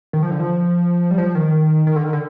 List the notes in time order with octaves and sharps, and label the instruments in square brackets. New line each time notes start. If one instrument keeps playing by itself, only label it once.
[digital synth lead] D#3
F3
D3
F3
G3
F3
D#3
D#3
D3
D#3
D3